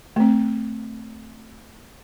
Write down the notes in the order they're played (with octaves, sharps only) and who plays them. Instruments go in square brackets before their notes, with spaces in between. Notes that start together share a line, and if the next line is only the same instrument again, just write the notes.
[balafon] A3 C4